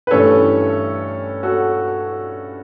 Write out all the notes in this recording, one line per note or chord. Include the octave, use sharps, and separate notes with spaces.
B4
G2 E3 A3 C#4 A4 C#5
F#4 A4